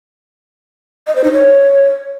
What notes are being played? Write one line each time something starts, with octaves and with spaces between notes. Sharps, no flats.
D#5
C5
D#4
C#5